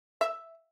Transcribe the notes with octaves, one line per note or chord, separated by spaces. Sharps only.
E5